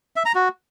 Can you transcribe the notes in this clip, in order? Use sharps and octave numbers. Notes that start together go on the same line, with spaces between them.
E5
A#5
F#4